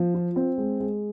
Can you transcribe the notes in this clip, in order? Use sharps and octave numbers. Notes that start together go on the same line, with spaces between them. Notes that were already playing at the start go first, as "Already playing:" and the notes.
Already playing: F3
F4
C4
G#3
G#3